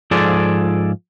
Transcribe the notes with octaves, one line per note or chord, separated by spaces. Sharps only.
G#2 F3 F4 G#4 A4 D5